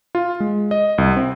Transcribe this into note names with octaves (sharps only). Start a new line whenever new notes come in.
F4
G#3
D#5
C2
C4